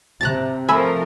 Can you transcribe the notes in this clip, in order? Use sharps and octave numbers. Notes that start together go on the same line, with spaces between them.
C3 A5 A#5 F#6 A6
F3 A3 A#4 G#5 B5 E6